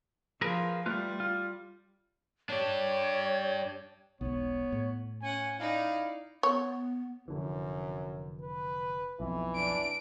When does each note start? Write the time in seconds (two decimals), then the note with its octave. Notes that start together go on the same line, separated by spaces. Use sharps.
0.42 F3 G#4 A#4 B4
0.86 G3 A3 F4 B4
1.20 F4
2.49 D4 G4 C#5
4.21 E1 B1 B3 C#5
4.72 A2
5.22 C#4 F#5 G#5
5.59 D#4 E4 D5 F5
6.43 B3 C#5
7.28 F1 F#2 D3 E3
8.42 B4
9.20 B1 F2 E3
9.56 D4 D7